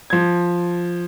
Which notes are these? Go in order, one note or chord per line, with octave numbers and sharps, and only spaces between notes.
F3 G#6